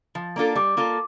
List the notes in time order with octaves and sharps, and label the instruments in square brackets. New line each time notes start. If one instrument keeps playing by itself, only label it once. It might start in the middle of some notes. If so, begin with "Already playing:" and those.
[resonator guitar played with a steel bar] F3
A#3 D4 F4 A4
[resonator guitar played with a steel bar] G3 [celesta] D6
[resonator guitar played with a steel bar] A#3 F4 A4